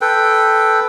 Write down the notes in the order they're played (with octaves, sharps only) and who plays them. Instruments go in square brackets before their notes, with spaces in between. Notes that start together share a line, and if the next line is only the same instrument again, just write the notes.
[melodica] A4 B4 G5